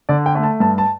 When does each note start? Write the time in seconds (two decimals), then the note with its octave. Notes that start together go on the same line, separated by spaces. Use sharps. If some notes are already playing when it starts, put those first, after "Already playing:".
0.09 D3 D5
0.26 G5
0.35 A3
0.43 A5
0.60 G2 A5
0.78 A5